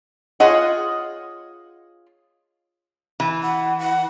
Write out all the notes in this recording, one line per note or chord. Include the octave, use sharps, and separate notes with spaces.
F4 G#4 C#5 D#5 F#5
E3
F#5
F#5